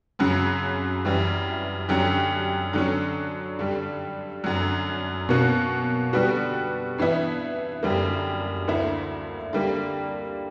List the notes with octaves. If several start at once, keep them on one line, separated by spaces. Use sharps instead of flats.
F#2 C#3 F#3
F#2 E3 G3
F#2 D3 F#3 C#4 G4
D3 F#3 C#4
G2 D3 G3
F#2 D3 F#3
B2 A#3 C#4 F#4
D3 G3 B3 F#4
G2 E3 B3 E4
F#2 D3 G3 A#3
D2 D3 A#3 E4
D3 G3 A#3